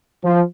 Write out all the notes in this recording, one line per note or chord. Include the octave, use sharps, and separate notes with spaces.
F3